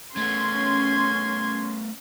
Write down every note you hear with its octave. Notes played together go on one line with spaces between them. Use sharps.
A3 B3 C#4 C6 G#6